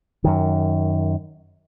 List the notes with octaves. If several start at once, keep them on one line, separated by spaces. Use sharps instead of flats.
F#2 D#3